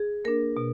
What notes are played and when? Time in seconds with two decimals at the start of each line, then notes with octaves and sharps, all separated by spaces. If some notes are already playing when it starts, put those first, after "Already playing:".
Already playing: G#4
0.25 A#3 D4 A#4
0.57 B2